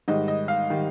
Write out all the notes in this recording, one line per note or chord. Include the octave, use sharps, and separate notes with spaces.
G#2 D#3 G3 D#5
D#5
F5
D#3 G3